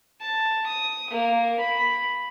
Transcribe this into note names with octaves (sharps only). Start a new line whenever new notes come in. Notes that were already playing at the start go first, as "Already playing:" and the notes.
A5
D#6
A#3
B5